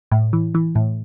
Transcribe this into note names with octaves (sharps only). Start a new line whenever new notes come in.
A2
E3
E3
A2